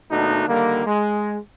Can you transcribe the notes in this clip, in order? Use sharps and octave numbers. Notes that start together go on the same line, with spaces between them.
D#2 B2 A3 D4 D#4 F#4
D3 D#3 G3 A#3
G#3